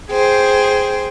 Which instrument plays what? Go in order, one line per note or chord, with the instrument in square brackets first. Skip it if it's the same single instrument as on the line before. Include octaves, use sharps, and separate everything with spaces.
[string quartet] G#4 C5 G5